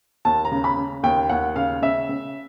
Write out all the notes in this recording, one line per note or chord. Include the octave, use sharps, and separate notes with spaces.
D#2 A5
A#5
C#3
B5
C#3
D#2 G5
D#2 F#5
C#3 F5
C#3 E5
C#3